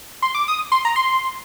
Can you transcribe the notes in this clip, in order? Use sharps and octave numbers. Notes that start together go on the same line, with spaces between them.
C6
D6
D#6
C6
A#5
C6